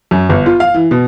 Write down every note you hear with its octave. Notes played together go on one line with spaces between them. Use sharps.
F#2
G1
F4
F5
E3
B2